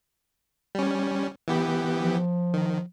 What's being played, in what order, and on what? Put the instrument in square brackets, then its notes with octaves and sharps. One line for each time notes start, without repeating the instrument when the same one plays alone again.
[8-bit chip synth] G3 C#4
E3 B3 G4
[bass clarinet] F3
[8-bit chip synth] D#3